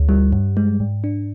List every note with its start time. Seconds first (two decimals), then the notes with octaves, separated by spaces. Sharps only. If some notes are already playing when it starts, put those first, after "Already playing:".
Already playing: D2
0.09 G3
0.33 G2
0.57 G#3
0.80 G#2
1.04 D4